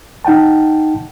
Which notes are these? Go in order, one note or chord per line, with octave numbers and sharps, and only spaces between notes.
D#4 F#5 G5 A5